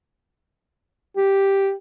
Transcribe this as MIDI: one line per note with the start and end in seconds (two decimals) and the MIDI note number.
1.16 1.73 67